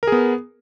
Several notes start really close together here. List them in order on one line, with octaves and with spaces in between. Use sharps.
A#4 G#4 B3